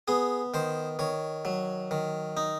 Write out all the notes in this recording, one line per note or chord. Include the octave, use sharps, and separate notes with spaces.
B3 G#4
D#3 C5
D#3 C#5
F#3
D#3
D#4